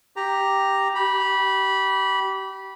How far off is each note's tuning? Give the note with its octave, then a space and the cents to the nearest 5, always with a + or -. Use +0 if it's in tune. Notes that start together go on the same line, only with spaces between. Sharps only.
G4 +0 A#5 +0
G4 -30 B5 -15